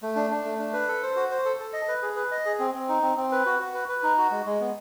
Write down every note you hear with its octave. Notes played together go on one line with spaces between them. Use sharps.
A3
D4
D4
A3
D4
B4
A4
C5
F#4
C5
A4
A4
D#5
B4
G#4
B4
D#5
G#4
C4
C4
D#4
C4
C4
B4
F#4
F#4
B4
B4
D#4
F#4
G#3
G#3
B3